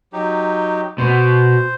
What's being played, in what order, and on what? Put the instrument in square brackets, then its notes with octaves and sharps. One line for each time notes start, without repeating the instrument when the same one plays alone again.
[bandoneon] F#3 D#4 G4
[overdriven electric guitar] B2 [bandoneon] C5